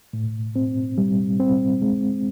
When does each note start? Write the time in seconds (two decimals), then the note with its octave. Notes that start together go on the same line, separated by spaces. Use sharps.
0.13 A2
0.56 C4
0.98 G3
1.40 C4
1.82 G#3